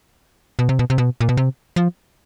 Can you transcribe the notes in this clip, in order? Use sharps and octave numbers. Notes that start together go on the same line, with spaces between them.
B2
C3
B2
C3
B2
A#2
B2
C3
F3